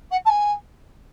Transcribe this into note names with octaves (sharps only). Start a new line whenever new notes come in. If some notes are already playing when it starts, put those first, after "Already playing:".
F#5
A5
G#5